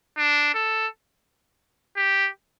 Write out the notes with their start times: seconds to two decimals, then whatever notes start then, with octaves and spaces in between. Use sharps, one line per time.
0.18 D4
0.55 A4
1.97 G4